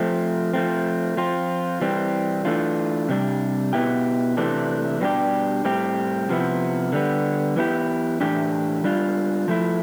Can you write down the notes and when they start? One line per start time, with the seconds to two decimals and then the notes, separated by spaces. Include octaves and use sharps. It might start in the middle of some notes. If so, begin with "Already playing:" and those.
Already playing: F3 A3 C4
0.53 F3 A3 C4
1.17 F3 C4 F4
1.81 E3 G3 C4
2.45 E3 A3 D4 F4
3.09 C3 G3 D4
3.73 B2 B3 E4 G4
4.37 C3 E3 A3 D4
5.01 B2 G3 B3 D4 G4
5.65 A2 G3 C4 G4
6.29 C3 F3 B3 E4
6.93 D3 G3 B3
7.56 E3 B3 E4 G4
8.21 A2 E3 A3 D4 G4
8.84 G3 D4 F4
9.48 F3 A3 E4